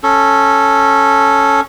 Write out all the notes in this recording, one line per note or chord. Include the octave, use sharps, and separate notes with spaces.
C#4 A4